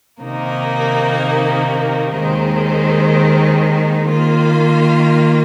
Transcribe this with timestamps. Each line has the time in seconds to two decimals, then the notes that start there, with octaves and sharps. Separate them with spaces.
0.21 C3 D#3 A#3 D#4
2.15 D#2 D#3 G#3 C4 D#4
4.09 D#3 A#3 F4